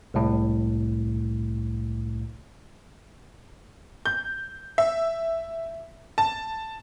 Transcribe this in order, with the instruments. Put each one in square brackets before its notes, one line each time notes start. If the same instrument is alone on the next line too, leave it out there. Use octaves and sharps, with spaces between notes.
[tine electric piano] C2 A2
[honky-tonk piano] G6
E5
A5